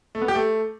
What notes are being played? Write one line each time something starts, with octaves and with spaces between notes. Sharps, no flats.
A3
B3
G4
A3